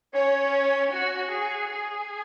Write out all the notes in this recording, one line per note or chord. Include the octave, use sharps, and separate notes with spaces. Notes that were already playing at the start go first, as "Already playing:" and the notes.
C#4 C#5
F#4
G#4
G#4